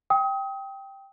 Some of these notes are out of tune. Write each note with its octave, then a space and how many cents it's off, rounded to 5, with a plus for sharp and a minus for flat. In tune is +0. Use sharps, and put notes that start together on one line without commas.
G5 +0 D#6 +30